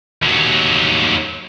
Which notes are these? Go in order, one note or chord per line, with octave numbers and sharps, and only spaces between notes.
D#2 F#3